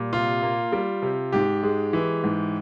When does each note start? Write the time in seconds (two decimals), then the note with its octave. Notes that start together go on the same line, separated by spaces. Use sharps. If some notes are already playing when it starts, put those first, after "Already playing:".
Already playing: A#2 G3
0.13 C3 F4
0.42 A#3
0.72 G3
1.02 C3
1.33 G#2 G4
1.63 G#3
1.93 E3
2.23 G#2